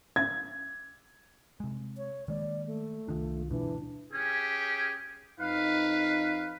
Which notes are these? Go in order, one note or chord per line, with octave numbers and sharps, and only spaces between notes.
G#6
C3 G#3
C#5
D#3 G#3 A#3 D5
A3
C2 D#3 D4 F4
D2 G2 B2 E3 D4
C#4 G4 G#4
F2 D#4 B4 F5